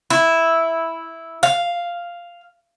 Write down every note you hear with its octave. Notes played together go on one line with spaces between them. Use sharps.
E4
F5